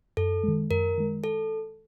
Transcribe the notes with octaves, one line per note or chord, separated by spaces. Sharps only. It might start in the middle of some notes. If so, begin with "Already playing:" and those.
F#2 A4
D#3 G#3
F#2 A#4
D#3 G#3
A4